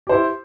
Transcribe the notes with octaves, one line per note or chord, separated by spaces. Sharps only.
E4 G4 C5